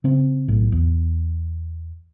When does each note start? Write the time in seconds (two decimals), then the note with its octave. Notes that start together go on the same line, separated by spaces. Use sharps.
0.04 C#3 C4
0.48 B1 A2
0.72 E2